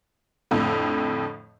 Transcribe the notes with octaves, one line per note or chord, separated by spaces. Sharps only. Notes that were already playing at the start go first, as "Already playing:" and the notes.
F2 A2 D3